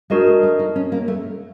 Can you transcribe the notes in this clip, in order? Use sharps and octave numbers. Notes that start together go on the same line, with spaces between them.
G#3 D4 F#4 A#4 D#5
A3
A3
D#4
C#4
A#3
A3